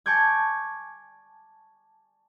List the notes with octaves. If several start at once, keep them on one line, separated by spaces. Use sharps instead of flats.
G#5 A5 C#6 D6 G6 G#6